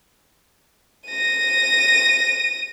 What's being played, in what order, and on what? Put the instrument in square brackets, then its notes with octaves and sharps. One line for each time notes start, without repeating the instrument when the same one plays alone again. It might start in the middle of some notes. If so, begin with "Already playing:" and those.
[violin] A#6 D#7